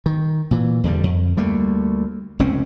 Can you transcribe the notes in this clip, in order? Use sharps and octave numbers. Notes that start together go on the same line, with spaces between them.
D#3
A#2 E3
E2 D3 G3
F2
D2 G3 A3 A#3
F1 C#2 C4 C#4